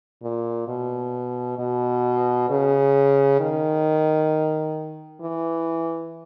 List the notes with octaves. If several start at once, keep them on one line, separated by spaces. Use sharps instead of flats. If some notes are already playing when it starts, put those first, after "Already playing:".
A#2
B2
B2
C#3
D#3
E3